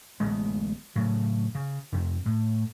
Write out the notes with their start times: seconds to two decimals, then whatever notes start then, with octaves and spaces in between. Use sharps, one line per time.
0.20 D1 A1 G#3 B3
0.95 A2 C#3 F#3
1.55 C#3
1.92 F2 C3 C4
2.25 A2